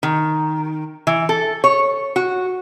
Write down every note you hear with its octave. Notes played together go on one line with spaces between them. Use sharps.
D#3
E3
A4
C#5
F#4